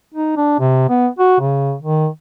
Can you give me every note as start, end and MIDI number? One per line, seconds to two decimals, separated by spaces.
0.14 0.32 63
0.37 0.57 62
0.60 0.89 48
0.89 1.07 59
1.19 1.37 66
1.40 1.74 49
1.82 2.08 51